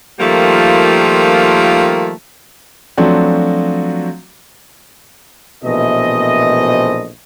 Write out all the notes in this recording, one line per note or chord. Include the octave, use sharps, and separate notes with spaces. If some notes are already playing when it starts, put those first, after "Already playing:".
D#3 F3 G3 A3 A#3 F4
F3 F#3 A3 C4 D4 F#4
A#1 B2 E3 A3 C4 D#5